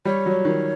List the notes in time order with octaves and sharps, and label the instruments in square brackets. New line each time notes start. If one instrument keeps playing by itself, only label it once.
[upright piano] G3 [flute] C#5
[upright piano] F#3
D#3